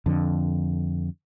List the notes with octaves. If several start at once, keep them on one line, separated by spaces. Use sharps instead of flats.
F2 D3